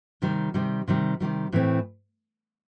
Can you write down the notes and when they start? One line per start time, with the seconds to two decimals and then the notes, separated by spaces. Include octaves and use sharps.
0.22 C3 D#3 G3
0.54 C3 D#3 G3
0.88 C3 D#3 G3
1.20 C3 D#3 G3
1.52 A2 E3 A3 C4